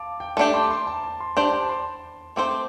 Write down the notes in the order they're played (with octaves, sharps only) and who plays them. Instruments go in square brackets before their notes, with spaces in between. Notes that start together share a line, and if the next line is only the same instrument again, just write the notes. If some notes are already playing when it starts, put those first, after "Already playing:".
Already playing: [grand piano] F5 A5 D6
G5
[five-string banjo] A3 D4 G4 [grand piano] A5
[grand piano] D6
C6
C6
A5
A5
C6
[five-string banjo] D4 G4 C5 [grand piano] A5
[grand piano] A5
A5
C6
[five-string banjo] A3 C4 A4 C5 [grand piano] D6